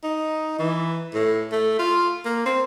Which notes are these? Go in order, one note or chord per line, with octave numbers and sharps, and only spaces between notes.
D#4
E3
A2
A3
F4
A#3
C4